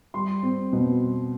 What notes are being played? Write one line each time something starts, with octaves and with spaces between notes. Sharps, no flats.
G3 C6
C4
B2